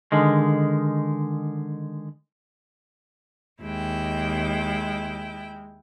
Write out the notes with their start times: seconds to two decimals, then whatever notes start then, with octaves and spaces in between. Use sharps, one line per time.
0.12 D3 D#3 G#3
3.63 D#2 G#3 E4 G5